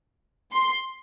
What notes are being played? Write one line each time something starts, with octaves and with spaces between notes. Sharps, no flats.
C6